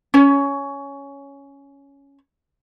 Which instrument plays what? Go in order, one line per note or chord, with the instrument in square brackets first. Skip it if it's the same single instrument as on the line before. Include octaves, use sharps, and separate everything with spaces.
[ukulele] C#4 C#5